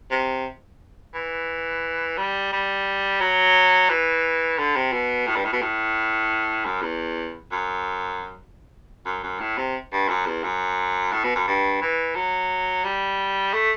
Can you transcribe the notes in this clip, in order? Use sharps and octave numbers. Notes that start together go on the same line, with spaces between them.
C3
E3
G3
G3
F#3
E3
D3
C3
B2
A2
G2
A2
B2
A2
F#2
E2
F#2
F#2
F#2
A2
C3
G2
F#2
E2
F#2
A2
B2
F#2
G2
E3
F#3
G3
A3